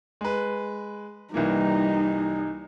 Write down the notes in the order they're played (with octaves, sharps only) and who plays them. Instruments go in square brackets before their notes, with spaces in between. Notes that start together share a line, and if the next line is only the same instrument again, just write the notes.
[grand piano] G#3 B4
[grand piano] C2 E3 A#3 [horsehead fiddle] G3 D#4